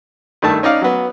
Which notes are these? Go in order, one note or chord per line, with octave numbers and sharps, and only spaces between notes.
G2 D#3 A3 A5
C#4 D#4 D5 F5
F#3 B3